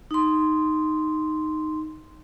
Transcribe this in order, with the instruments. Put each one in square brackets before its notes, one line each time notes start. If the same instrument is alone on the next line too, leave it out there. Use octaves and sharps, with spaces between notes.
[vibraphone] D#4 C6